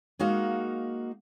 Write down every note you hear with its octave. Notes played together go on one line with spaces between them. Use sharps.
G#3 A#3 D#4 F#4 F5 F#5